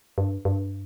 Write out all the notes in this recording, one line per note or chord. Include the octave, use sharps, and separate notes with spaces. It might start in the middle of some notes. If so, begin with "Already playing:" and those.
G2
G2